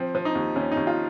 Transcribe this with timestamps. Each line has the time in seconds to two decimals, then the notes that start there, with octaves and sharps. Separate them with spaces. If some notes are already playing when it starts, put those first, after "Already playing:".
Already playing: F3 C4
0.15 F3
0.25 D#4
0.35 D#2
0.56 D#2 C#4
0.72 D#4
0.77 D#2
0.87 F4